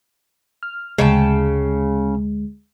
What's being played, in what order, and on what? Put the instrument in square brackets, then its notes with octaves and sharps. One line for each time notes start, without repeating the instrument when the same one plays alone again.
[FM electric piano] F6
[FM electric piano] D2 G#3 [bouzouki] C#3 G5 A5